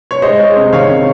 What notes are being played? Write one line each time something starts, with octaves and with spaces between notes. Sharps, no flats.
C#5
G#3 C5 D#5
G#3
C3
D#3 C#5 F5
C3